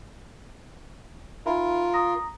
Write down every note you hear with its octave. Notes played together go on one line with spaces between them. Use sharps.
D#4 F4 A#4 E5 B5
A#5 D#6 A#6